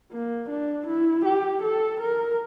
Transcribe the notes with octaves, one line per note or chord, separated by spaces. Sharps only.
A#3
D4
E4
G4
A4
A#4